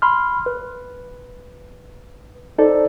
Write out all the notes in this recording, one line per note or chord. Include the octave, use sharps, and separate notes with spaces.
B5 C6 F6
B4
D#4 A4 C5 D5